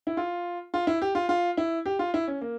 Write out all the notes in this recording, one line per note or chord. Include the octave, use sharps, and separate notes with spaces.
E4
F4
F4
E4
G4
F4
F4
E4
G4
F4
E4
C#4
A#3